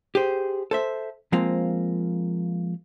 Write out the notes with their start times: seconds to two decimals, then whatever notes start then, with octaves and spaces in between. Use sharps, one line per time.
0.15 G4 G#4 C5
0.71 A4 C5 E5
1.32 F3 G#3 A#3 C4 F4